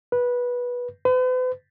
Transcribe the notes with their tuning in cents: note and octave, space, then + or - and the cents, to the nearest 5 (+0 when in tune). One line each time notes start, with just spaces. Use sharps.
B4 -15
B4 +45